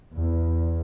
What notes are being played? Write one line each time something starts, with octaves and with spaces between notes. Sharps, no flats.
E2